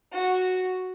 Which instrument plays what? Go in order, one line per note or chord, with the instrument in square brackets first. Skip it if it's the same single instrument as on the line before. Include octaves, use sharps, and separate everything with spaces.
[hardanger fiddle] F#4